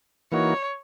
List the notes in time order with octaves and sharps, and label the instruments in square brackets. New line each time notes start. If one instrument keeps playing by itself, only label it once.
[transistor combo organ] E3 A#3 D#4 F#4 [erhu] C#5